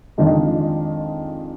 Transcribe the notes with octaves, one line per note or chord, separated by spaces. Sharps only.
F2 D#3 G#3 D4 F4